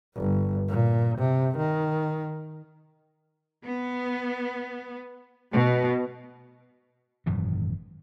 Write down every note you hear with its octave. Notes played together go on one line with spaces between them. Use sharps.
G1
A#2
C3
D#3
B3
B2
G#1 F#2 A#2 E3